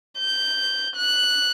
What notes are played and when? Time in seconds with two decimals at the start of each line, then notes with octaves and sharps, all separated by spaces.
0.19 G6
0.97 F#6